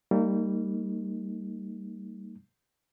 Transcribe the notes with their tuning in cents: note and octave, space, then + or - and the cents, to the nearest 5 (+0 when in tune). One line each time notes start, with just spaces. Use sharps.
G3 +0 A#3 -35 D#4 +0